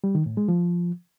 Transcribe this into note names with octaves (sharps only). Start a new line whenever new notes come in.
G3
D#3
A2
G#3
F3